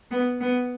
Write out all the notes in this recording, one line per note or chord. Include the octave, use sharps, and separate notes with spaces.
B3
B3